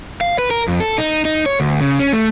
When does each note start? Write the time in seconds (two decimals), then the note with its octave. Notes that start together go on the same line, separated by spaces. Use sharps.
0.21 F5
0.39 B4
0.51 A#4
0.68 F2
0.80 A4
0.98 D#4
1.25 D#4
1.46 C#5
1.60 D2
1.81 C#3
1.99 C#4
2.13 A3